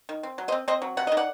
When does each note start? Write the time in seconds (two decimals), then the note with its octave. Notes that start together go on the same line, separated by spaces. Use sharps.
0.09 D#3
0.23 C4
0.38 F#3
0.48 C5 D#5
0.52 C4
0.68 C4 C5 D#5
0.82 F#3
0.97 C3 F#5
1.07 D#3 D#5
1.17 D5 F#5